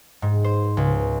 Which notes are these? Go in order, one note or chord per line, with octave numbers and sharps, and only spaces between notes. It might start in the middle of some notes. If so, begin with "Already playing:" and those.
G#2
C5
C#2